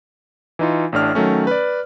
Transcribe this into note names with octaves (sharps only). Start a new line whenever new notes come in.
E3 D#4 F4
A1 A2 D4 F6
D#3 F#3 A3 C#4
B4 D5